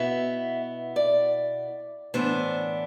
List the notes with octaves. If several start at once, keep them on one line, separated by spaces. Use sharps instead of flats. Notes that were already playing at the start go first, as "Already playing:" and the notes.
Already playing: B2 B3 E4 E5
D5
A2 E3 B3 D4 C5